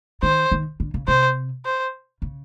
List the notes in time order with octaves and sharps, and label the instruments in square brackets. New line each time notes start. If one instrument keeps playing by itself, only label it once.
[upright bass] D#3 [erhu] C5
[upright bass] D#3
D3
C#3
[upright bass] C3 [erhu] C5
[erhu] C5
[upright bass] C#3